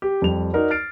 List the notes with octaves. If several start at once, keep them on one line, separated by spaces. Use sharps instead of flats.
G4
F2 G3 F7
D#4 F#4 A#4 D5
F6 A6 C7 D7